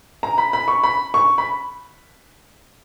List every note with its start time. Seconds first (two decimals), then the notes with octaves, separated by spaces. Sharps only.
0.23 A#5
0.38 B5
0.53 B5
0.68 C#6
0.83 B5
1.14 C#6
1.38 B5